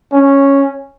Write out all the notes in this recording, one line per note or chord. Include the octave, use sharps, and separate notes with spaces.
C#4